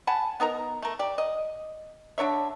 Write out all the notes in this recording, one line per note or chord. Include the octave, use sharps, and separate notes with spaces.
F#5 G#5 A5 B5
B3 D#4 A#4 A#5
A3 A#4
G4 D5
D#5
D3 D4 C#5 E5